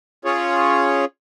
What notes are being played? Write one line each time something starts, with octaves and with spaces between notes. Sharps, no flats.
C#4 F4 G#4 C#5